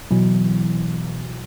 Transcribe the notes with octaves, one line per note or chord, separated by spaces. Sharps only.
B2 E3 F#3